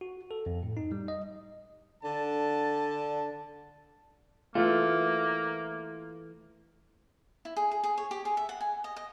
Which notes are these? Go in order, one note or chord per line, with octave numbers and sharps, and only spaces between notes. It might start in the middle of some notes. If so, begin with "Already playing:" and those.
F#4
A4
F2
A2
D#4
G3
D#5
D3 A5
E3 A3 A#3 F4
E4
G#4
G#4
G#4
C#5
G4
G#4
E5
F#5
G#5
D#5
D#5